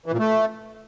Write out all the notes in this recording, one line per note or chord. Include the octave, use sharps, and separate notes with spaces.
E3
A#2
A3